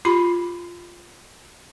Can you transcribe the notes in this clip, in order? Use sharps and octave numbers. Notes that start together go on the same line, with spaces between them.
F4 G4 B5